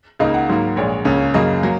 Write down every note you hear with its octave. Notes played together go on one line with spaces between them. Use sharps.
C#2 C#3 A#3 D#4 D#5
F#5
G#2 F#3 A#3
A#1 A#2 G#3 C#5
C#2 C#3 A#3 C#4
F#2 C#3 F#3 A#3 D#5
F#3 A#3